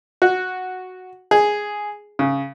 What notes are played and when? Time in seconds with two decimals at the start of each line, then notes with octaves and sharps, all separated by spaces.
0.22 F#4
1.31 G#4
2.19 C#3